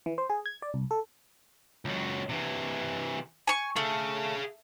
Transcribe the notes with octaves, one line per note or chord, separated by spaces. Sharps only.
E3
C5
G#4
G#6
D5
C2
A4
C#2 F#3
C3 E3
G#5 C#6
A3 G#4 F5